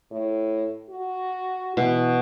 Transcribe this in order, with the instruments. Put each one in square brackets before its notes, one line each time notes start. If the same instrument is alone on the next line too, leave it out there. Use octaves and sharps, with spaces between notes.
[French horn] A2
F#4
[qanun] B2 [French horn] E3